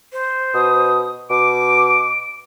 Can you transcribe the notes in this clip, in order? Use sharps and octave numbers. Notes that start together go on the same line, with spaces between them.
C5
B2 D#6
B2 D6 D7